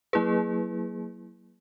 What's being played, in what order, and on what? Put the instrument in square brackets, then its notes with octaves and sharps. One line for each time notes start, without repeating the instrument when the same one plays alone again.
[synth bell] F#3 A#3 E4 G#4 B4